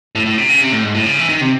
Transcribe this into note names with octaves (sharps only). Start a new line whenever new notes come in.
A2
A2
C3
C#3
C3
A2
G#2
A2
C#3
E3
D#3
C3